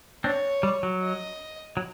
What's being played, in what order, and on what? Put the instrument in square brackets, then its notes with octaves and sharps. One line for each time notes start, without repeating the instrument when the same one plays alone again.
[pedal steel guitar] C4 D4 [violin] C#5
[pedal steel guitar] G3
F#3
[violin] D#5
[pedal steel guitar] F#3